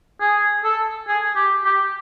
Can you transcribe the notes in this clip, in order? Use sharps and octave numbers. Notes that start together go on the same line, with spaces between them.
G#4
A4
G#4
G4
G4